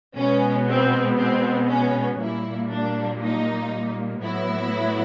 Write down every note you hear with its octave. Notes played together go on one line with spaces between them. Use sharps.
B2 G#3 B3 C#4
C4
C4
C#4
A#2 G3 A#3 E4
D4
D#4
A2 F#3 B3 E4